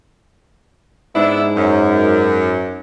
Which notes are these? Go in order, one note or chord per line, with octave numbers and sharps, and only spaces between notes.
G#2 B3 D4 E4
F#2